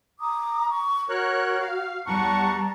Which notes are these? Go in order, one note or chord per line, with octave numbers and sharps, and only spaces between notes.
A#5 D6 D#6
C#6
F#4 A#4 C#5 F#6
F5
E2 G3 F#5 A5 A#5 C#6